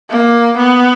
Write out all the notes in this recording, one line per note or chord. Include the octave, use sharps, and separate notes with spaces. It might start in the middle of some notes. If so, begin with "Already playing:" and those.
A#3
B3